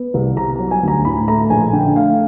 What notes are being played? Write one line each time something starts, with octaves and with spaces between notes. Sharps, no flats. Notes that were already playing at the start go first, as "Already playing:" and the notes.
Already playing: B3
C2
C3 A#5
F#3
G#5
D2 A#5
A2 B5
A3 A#5
A#1 G#5
D3 G5
A3 F5